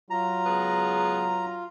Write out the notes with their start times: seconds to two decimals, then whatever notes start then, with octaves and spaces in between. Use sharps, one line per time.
0.10 F#3 F4 A#5
0.45 C#3 G#3 B3